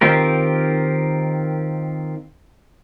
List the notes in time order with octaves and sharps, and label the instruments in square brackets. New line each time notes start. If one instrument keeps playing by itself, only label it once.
[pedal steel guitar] D#3 C4 F4 G4 A#4